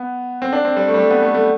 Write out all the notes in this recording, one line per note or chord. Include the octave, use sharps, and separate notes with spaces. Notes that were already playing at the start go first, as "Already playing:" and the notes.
Already playing: B3
C4
D4
C4
G3
A3
G3
A3
B3
A3
A3